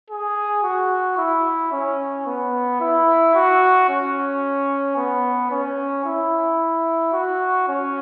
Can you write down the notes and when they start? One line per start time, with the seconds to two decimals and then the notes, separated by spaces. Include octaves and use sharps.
0.10 G#4
0.63 F#4
1.17 E4
1.72 C#4
2.27 B3
2.81 E4
3.35 F#4
3.89 C#4
4.96 B3
5.51 C#4
6.05 E4
7.13 F#4
7.68 C#4